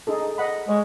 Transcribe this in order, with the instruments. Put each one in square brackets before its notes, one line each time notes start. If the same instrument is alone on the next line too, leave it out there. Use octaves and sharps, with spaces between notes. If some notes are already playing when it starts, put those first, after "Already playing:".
[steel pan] D#4 G#4 A4
D#5 F#5 B5
[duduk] G#3 [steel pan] C#5